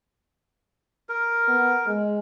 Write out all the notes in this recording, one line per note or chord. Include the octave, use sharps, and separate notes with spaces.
A#4
B3
G#3